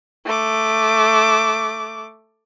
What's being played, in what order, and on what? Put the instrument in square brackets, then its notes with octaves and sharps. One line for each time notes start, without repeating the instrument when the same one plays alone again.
[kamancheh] A3 D6